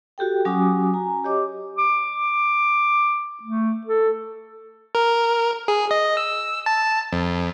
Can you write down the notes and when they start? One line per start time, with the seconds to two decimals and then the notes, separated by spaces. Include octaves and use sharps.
0.18 F#4 G4 A4 G5
0.45 F#3 C#4 F#4 G#5 D6 D#6
0.94 G#5 A#5
1.24 G4 C#5 D#5 D6
1.78 D6
3.43 A3
3.87 A4
4.95 A#4
5.68 G#4
5.91 D#5
6.17 E6
6.66 A5
7.13 F2